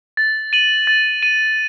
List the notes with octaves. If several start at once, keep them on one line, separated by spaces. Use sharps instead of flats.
A6
D#7 F#7
A6
D#7 F#7